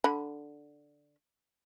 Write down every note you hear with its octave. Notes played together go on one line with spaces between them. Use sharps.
D3 B5